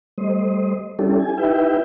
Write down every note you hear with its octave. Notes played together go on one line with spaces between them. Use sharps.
G3 A3 C5 D#5
G3 C#4 D4 E4 G4 A4
G#5
D#4 E4 G4 B4 E5 G5